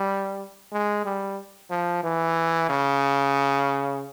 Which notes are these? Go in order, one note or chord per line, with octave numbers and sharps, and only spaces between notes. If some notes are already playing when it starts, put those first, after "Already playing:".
Already playing: G3
G#3
G3
F3
E3
C#3